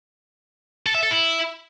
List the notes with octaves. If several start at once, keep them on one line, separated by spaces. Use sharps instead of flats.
A4
E5
A4
E4